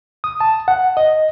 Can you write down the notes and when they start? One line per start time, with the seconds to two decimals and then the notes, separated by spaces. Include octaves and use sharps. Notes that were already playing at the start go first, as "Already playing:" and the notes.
0.24 D#6
0.41 A5
0.68 F#5
0.97 D#5